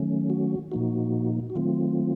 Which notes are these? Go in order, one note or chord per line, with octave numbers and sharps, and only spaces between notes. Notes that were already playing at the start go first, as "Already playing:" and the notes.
Already playing: D#3 F#3 A3 C#4
F#4
A#2 F3 A#3 D#4 F#4
F#4
D#3 F#3 A3 C4 F4